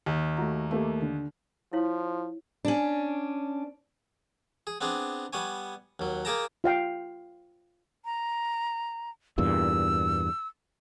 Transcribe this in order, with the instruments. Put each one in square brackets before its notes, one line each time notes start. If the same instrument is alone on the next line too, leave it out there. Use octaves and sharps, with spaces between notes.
[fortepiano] D#2
[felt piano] A3 F#4 A#5
A3 A#3 G4
D3
[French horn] F3 [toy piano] E4 C#5 F5
[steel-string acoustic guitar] C#4 D4
[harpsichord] G#4
B3 C4 D4 G#4
G3 B3 C#5 G#5
D#2 F#3
A#3 G#4 G5 A5 A#5
[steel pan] F4 F5 G5
[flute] A#5
[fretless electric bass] E2 G2 A#2 [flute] E6